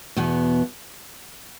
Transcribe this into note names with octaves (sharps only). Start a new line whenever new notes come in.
E2 B2 B3